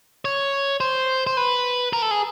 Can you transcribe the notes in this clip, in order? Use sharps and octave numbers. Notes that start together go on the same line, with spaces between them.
C#5
C5
C5
B4
A#4
A4
G#4